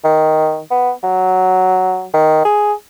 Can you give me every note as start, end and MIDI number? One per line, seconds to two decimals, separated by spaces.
0.04 0.60 51
0.71 0.92 59
1.03 2.06 54
2.14 2.44 51
2.45 2.73 68